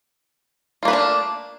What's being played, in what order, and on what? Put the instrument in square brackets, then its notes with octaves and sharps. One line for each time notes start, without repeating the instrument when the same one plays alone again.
[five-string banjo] F4
A#3
B4
A3
D4